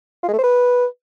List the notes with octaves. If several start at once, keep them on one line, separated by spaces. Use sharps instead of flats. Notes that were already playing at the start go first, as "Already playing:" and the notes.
F4
G#3
A3
C5
B4